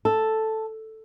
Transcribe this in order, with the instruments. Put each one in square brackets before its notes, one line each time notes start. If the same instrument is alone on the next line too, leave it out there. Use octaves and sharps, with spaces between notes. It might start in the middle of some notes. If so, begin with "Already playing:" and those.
[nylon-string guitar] A4